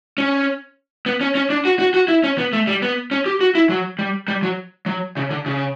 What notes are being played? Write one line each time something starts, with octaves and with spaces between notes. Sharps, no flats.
C#4
B3
C#4
C#4
D4
F#4
F#4
F#4
E4
C#4
B3
A3
G3
B3
C#4
G4
F#4
E4
F#3
G3
G3
F#3
F#3
C#3
D3
C#3